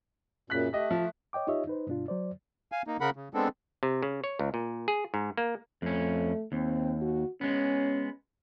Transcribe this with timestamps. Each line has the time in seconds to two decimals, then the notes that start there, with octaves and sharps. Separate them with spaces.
0.50 F#2 A#2 C#3 F#6 B6
0.73 A3 G4 D#5
0.91 F3
1.33 C#5 D#5 G5 D6
1.47 D#4 F4 G4 C#5 D#5 E5
1.67 D#4 B4 C5
1.87 G2 B2 D4 F4
2.08 F#3 C5 D5
2.72 F5 G#5
2.87 A#3 D#4
3.00 C#3 A#4 F#5 B5
3.16 C#3
3.34 G#3 B3 C4 D4 A4
3.83 C3
4.03 C#3
4.24 C#5
4.39 C#2
4.54 A#2
4.88 G#4
5.14 G#2
5.37 A#3
5.82 F2 A3 C#4
6.52 D#2 C4
7.01 F#4
7.41 G#3 B3 C#4